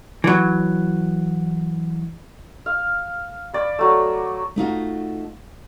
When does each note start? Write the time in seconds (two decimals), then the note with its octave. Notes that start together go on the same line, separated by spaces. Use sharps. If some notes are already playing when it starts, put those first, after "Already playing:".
0.24 E3 F#3
2.66 F5
3.53 D5 B5
3.79 F#3 A3
4.56 A3 D#4 F4 F#4